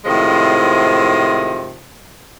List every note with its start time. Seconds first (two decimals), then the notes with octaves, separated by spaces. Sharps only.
0.05 A2 C3 D#3 F3 G#3